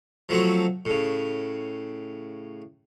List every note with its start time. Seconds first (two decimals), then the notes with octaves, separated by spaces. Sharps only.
0.29 F3 F#3 A3 C4 F#4
0.85 A2 C#3